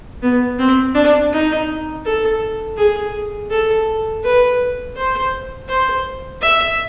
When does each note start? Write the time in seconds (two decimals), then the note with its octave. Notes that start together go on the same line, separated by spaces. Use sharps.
0.22 B3
0.59 C4
0.95 D4
1.32 D#4
2.05 A4
2.77 G#4
3.50 A4
4.24 B4
4.96 C5
5.69 C5
6.41 E5